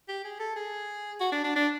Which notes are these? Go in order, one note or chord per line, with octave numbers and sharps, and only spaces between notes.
G4
G#4
A4
G#4
F#4
D4
D4
D4